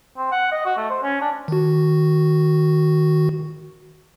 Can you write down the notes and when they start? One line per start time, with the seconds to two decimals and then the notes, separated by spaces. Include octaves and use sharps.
0.17 C4
0.32 F#5
0.52 D#5
0.65 F#4
0.77 A3
0.90 C5
1.03 C#4
1.21 D4
1.48 D#3 F#4